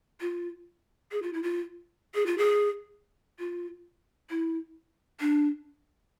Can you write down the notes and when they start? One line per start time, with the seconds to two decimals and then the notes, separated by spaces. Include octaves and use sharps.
0.21 F4
1.12 G#4
1.23 F4
1.33 E4
1.43 F4
2.15 G#4
2.26 F4
2.38 G#4
3.39 F4
4.30 E4
5.21 D4